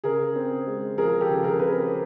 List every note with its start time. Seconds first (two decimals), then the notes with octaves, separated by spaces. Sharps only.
0.04 C#3 G#4 A#4
0.35 C4
0.67 G#3
0.97 F3 G#4 A#4
1.21 G4 A4
1.29 C#3
1.44 G#4 A#4
1.59 C4 B4
1.68 G#4 A#4